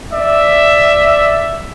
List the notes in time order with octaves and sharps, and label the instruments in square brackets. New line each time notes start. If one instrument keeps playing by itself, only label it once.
[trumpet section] D5 E5